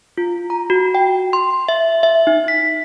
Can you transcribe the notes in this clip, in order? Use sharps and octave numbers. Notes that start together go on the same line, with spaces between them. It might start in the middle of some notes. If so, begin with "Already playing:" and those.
F4
A#5
F#4
G5
C6
E5
E5
D#4
B6